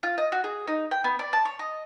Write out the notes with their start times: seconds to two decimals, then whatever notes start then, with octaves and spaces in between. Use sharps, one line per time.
0.03 F4
0.18 D#5
0.32 F#4
0.44 G#4
0.67 D#4
0.91 G5
1.04 B3
1.19 D5
1.33 A5
1.45 C#5
1.59 D#5